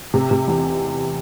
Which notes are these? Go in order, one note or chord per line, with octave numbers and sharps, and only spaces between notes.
C3
C3
E2